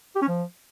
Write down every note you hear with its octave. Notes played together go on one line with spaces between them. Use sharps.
G4
C#4
F3